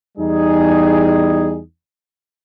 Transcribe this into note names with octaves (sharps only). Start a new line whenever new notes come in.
E2 G3 D#4 G#4